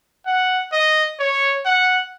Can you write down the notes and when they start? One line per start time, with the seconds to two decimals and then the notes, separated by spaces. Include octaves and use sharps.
0.26 F#5
0.72 D#5
1.20 C#5
1.65 F#5